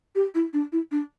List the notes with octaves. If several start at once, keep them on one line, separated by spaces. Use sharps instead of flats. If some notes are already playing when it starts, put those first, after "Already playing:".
G4
E4
D4
E4
D4